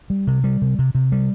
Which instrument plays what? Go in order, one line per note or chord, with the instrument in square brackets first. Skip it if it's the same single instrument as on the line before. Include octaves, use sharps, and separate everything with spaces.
[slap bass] G3
C3
G3
C3
C3
C3
G3